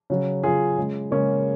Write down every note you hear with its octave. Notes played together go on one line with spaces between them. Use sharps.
C#3 F#3
C#3 F#3 F4 G#4
C#3 G#3
C#3 G#3 A#3 C#4